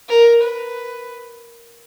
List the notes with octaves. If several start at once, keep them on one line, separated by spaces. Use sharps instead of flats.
A#4
B4